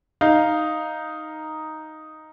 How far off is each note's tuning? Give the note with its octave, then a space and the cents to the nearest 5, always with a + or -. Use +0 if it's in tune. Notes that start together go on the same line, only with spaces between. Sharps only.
D#4 +0 F5 +0